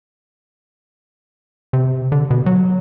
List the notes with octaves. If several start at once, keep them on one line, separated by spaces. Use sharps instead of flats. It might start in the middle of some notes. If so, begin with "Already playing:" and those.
C3
D3
B2
F#3